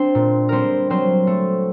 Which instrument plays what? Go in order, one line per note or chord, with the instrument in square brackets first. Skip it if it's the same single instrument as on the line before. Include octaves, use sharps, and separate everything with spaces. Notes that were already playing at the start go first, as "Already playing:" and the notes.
Already playing: [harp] C4 D4 C5 D5
A#2
G3 C4 A#4 C5
F#3 C4 C5
A3